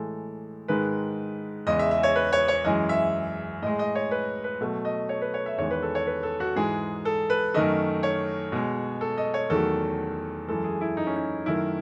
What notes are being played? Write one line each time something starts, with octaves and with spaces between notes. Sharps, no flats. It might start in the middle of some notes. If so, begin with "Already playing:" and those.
Already playing: A2 E3 G#3 A4
G#2 D#3 G#3 B4
E2 C#3 G#3 D#5
E5
E5
C#5
B4
C#5
C#5
F#2 E3 G#3 D#5
E5
A2 G#3 D#5
D#5
C#5
B4
B4
B2 F#3 A3
D#5
C#5
B4
C#5
E5
E2 D#3 G#3 C#5
B4
A4
C#5
B4
A4
F#4
G#2 E3 G#3 G#4
A4
B4
F#2 D#3 A3 D#5
C#5
B2 G#3
A4
D#5
C#5
E2 D#3 F#3 A3 A4
F#2 E3 G#3 A4
G#4
E4
D#4
C#4
D#4
F#2 D#3 A3 E4